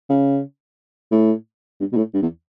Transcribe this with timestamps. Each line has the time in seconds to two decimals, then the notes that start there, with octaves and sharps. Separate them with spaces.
0.09 C#3
1.11 A2
1.80 G2
1.92 B2
1.97 A2
2.14 G2
2.22 E2